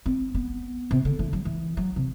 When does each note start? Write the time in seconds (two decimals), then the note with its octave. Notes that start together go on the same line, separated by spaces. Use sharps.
0.06 C4
0.35 B3
0.91 C3
1.05 D3
1.19 E3
1.33 F#3
1.45 E3
1.77 F#3
1.96 C3